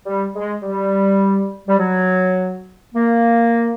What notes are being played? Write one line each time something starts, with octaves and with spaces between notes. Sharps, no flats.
G3
G#3
G3
G3
F#3
A#3